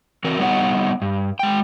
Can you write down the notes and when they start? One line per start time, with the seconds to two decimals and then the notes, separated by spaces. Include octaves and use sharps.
0.25 E3 C4 F#4 A#4
0.40 G3 B3 D#4 B4 C#5 F#5
1.02 G2
1.39 G#3 G5